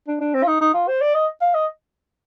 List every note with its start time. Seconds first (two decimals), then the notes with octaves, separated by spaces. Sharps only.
0.08 D4
0.21 D4
0.34 C4
0.43 F4
0.47 D#4
0.61 D#4
0.74 F4
0.88 C5
1.01 D5
1.15 D#5
1.41 F5
1.54 D#5